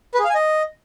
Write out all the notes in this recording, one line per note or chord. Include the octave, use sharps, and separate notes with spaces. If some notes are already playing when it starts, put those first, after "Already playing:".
B4
G#4
F5
G#5
D#5